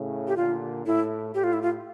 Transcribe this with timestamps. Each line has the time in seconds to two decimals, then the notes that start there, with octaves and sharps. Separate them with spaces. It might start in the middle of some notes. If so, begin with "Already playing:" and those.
Already playing: A2 C#3
0.28 G4
0.37 A#2 D3 F4
0.86 A2 E4
1.35 A2 G4
1.44 F4
1.53 E4
1.62 F4